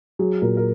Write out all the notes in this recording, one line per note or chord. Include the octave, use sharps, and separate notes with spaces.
F#3 G#4
A#2 A#4
A#4